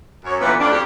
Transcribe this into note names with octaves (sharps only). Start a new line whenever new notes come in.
F#2 C#5
A#2 D3 E3 B3
F2 A3 D4
F2 G4